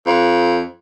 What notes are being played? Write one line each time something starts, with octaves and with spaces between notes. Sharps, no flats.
F2